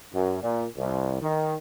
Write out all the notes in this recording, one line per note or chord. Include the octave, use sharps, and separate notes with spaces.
F#2
A#2
C2
D#3